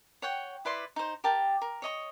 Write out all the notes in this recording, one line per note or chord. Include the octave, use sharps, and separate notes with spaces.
C#5 F#5 G5
E4 B4 D5 C6
D#4 C5
G4 A#4 G5 A5
A#4
C#5 D#5 C#6